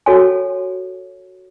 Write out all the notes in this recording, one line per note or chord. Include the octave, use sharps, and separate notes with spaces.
F#4 A4 C#5 G#5 C#6